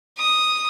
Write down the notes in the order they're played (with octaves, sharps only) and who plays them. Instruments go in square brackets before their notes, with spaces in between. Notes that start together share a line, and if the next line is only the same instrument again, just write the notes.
[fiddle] D#6